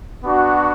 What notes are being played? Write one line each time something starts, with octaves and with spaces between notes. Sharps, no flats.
B3 D4 F#4